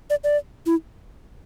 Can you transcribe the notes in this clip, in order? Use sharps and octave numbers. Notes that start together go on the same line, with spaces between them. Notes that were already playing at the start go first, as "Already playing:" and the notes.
D5
D5
E4